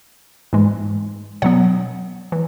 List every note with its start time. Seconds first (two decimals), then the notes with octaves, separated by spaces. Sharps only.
0.53 G#2 E3 G#3
1.42 B2 F#3 B3 C#5 F#5
2.32 E3